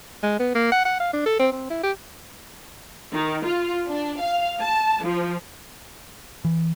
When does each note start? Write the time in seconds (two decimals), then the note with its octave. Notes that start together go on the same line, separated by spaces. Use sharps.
0.23 G#3
0.39 B3
0.55 A#3
0.72 F#5
0.85 F#5
1.00 F5
1.13 D4
1.26 A4
1.39 C4
1.52 C4
1.70 E4
1.83 G4
3.12 D#3
3.45 F4
3.88 D4
4.19 F5
4.61 A5
5.03 F3
6.45 E3